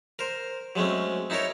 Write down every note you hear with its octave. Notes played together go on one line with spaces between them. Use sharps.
A#4 C5
F#3 G#3 A3 C4 C#4
D#4 E4 A4 A#4 C#5